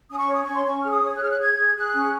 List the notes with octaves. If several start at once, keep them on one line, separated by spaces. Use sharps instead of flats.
C#4 D#6
C#6
C#5
D#6
C#6
C#4
C6
C#4 C#6
G#4 F6
D#6
C#5
F#6
G#4 F6
F#6
G#4 G#6
G#4
G#4 F#6
C#4